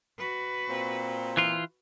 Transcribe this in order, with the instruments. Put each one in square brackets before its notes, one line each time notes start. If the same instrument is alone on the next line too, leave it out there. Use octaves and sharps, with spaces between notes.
[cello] F#4 B4
[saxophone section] A#2 C4
[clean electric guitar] E3 F4